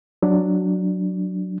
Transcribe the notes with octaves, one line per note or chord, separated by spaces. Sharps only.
F#3 D4